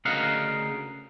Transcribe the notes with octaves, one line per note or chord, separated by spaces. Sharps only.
D2 C#3 A#4 D#5 F5 F#5